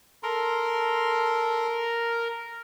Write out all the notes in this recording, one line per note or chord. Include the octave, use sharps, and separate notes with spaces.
A4 A#4 C6